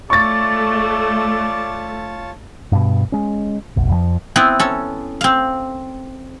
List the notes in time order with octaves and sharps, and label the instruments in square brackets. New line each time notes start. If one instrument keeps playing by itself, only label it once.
[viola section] A3 [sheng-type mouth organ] F4 C#5 A5 [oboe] D5 [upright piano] C#6 A6
[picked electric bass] G2 B2
G#3 C#4
F1 B1
F2 C#3 F3
[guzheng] B3 C4 E4
C#4 A4
C4 F5